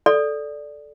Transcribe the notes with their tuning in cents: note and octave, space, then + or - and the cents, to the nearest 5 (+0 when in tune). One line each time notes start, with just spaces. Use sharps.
A4 -10 D5 +0